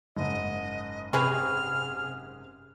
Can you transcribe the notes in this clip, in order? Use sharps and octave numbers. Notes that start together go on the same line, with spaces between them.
F#1 G#2 D#5
C3 C4 C#4 G#4 B4 F6